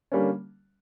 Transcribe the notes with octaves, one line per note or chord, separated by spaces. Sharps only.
D3 G3 A#3 C#4